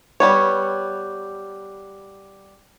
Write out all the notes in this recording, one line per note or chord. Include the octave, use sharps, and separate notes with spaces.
G3 B3 C#5